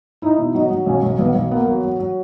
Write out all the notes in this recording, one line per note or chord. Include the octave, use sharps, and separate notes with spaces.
D#4 E4
B2
F#3 D#4
F#3
B1 C#4
B1
B1 B3
B1
A#3 B3
F#3
F#3
F#3